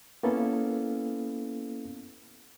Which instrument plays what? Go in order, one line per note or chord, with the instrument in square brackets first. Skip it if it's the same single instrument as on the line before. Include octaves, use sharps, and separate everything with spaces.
[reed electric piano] A#3 B3 C#4 E4 A4 F5